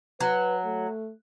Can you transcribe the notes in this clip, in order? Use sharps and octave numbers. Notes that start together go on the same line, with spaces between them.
F#3 B4
A3